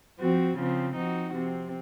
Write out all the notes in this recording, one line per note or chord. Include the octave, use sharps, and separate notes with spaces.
F3 C4 F#4
C#3 F3 C4
F3 C4 D#4 F#4
C3 F3 C4